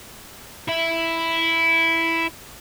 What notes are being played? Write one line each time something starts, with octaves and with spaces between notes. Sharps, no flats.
E4 E5